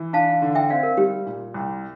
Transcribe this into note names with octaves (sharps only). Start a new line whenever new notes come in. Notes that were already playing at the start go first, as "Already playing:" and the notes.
Already playing: E3
D4 F5 A5
D3
E5 G5
C4 D5 F5
A#4
G3 G4
A#2
C2